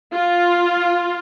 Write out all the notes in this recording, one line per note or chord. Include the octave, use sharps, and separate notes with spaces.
F4